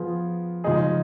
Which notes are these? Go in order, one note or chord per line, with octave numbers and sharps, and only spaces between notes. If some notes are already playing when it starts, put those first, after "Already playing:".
Already playing: F3 B3 F4 G#4
C#3 F3 G#3 D#4 G#4